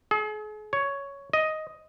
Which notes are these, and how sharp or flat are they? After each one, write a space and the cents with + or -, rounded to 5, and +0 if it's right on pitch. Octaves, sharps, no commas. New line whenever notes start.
G#4 +40
C#5 +10
D#5 +5